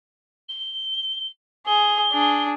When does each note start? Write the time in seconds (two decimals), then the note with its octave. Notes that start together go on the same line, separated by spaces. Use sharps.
0.49 G7
1.67 G#4 G7
2.13 D4 G#4